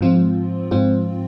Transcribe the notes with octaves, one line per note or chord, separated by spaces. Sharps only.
G#2 F3 C4 F4
G#2 F3 C4 F4